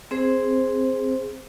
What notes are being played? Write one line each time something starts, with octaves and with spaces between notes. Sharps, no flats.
C4 G#4 C5